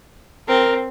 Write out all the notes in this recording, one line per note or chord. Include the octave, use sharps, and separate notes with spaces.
C4 A#4